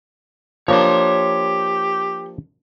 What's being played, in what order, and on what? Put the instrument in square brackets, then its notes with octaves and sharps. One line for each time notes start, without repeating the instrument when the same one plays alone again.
[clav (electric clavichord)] F3 A#3 D4 [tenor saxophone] G4 [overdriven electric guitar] C#5 C6